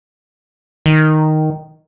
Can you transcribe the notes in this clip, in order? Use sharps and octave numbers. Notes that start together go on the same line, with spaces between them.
D#3